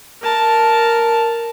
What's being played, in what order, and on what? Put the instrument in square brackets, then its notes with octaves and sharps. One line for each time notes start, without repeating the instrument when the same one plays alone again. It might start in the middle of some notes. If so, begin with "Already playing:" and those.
[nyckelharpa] A#4 A5